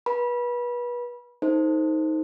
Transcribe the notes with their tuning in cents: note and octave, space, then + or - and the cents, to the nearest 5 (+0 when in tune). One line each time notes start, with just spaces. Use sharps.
B4 -30 B5 -25
D#4 +20 A4 +20 C5 +0